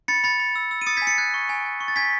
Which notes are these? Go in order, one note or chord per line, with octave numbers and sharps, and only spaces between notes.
B5 A6 C#7
B5 A6 C#7
B5
E6
E6
D#7
D#6 A6 C#7
G#6 B6
G#5
A6 C#7
F#6 G#6
C#6
G#5
G#5
C#6
A6
G#5 G#6 B6